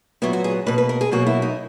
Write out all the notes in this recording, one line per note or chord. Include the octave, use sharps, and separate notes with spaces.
A#2 F#3 B3 E4
F#4
G#4
B2 A#3 B4
B4
A#4
G#4
B2 F#3 A#3 F#4
E4
D#4